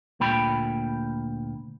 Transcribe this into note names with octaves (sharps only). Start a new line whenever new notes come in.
D2 A#2 G5 B5